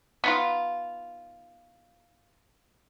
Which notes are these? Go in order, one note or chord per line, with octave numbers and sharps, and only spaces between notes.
B3 D#4 F4